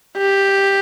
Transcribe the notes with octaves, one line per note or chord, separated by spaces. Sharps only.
G4